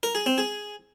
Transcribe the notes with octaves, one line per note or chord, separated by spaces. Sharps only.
A#4
G#4
C4
G#4